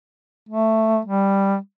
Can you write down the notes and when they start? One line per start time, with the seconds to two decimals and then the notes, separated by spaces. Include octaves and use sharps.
0.49 A3
1.06 G3